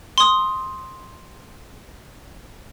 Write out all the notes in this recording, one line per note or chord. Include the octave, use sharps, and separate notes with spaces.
C6 D#6